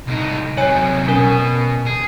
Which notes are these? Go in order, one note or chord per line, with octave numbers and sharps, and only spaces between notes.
C2 D#4
C3 F#3 C#5 G#5
B2 C#4 A#4 G#5
G#4